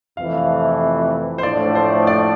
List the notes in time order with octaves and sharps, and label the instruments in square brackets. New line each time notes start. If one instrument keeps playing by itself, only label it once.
[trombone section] F2 C3 E3 A3 [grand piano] F5
[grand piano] C5
[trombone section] A2 F3 A3 D4 [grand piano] D5
[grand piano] C5
D5